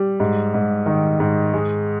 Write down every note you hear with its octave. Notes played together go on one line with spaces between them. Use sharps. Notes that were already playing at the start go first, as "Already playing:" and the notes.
Already playing: G3
G#2
G#2
D#3
G#2
G#3